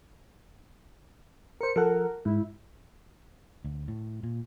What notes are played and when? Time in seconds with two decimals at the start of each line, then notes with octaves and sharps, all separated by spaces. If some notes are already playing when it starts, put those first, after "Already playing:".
1.61 A#4 C5 C#7
1.76 F3 A4 A#4 F#5
2.25 G#2 E4
3.65 D2
3.88 A2
4.23 A#2